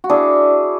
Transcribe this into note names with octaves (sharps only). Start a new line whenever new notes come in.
F#4
D4 E4 G#4